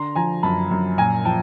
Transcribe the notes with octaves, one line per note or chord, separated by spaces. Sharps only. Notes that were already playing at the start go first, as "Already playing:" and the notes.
Already playing: D3 A#5 C6
F3 G#5 A#5
F#2 A5 B5
F#2
A#2 G#5 A#5
F3 G5 A5